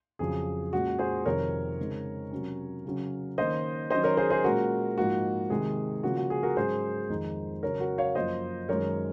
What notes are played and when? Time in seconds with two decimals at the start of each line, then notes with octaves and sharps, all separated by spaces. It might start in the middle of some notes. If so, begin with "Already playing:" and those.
0.19 F2 C#3 F#3 G#4
0.73 A#2 G#3 C#4 F#4
0.99 G#4 C5
1.25 F2 C3 D#3 A#4 C#5
1.78 C#3 G#3 C4 D#4
2.32 C3 F#3 C#4
2.85 C#3 F#3 C#4
3.38 D#3 A#3 C#4 C5 D#5
3.90 D#3 F#3 C#4 C5 D#5
4.04 A#4 C#5
4.17 G#4 C5
4.30 G#4 C5
4.44 A#2 G#3 C#4 F#4 A#4
4.97 G#2 F3 A#3 D#4 F#4
5.50 C3 D#3 G#3 G#4
6.03 C#3 F3 A#3 C#4 F#4
6.17 F#4
6.30 G#4
6.43 F#4 A#4
6.56 G#2 F#3 C#4 G#4 C5
7.09 F2 D#3 G#3 D#4
7.63 C#3 F#3 C#4 A#4 C#5
7.80 F#4 A#4
7.98 C#5 F5
8.15 F#2 F3 A#3 C5 D#5
8.68 F#2 D#3 G#3 A#4 C#5